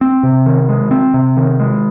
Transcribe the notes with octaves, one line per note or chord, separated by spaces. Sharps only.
C4
C3
D#3
G#3
C4
C3
D#3
G#3